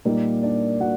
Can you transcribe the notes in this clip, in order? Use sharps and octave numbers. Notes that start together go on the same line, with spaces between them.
A#2 G3 A#3 D#4 A#4
D4 D5
A#2 F#4 F#5